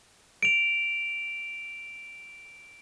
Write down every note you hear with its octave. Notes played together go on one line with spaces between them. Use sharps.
D7 F7